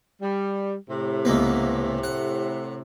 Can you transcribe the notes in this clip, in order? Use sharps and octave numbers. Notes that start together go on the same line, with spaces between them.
G3
A2 C3
C#2 A#3 B3
F#5